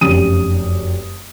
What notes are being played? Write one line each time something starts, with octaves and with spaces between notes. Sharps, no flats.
F1 F#2 C#4 G4 D#6 D#7